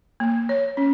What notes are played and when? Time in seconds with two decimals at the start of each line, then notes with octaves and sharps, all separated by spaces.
0.20 A#3
0.49 C#5
0.77 C#4